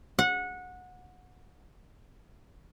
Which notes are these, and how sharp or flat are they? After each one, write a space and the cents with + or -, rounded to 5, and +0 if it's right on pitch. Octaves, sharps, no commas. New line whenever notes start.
F#5 -20